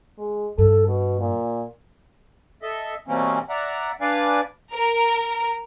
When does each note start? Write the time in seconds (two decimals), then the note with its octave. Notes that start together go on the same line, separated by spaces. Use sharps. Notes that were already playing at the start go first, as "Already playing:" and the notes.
0.18 G#3
0.58 G2 A4
0.88 B2
1.20 A#2
2.62 A4 D#5 E5
3.07 B2 E3 G3 A#3 C4 C#4
3.49 D5 E5 F#5 A#5
4.01 D4 B4 D5 F5 G#5
4.73 A#4